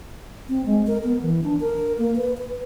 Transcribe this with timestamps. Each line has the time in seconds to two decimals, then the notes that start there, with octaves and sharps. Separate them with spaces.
0.49 C4
0.66 G#3
0.87 A#4
1.04 B3
1.22 E3
1.44 D4
1.61 A#4
1.99 A#3
2.16 B4
2.38 B4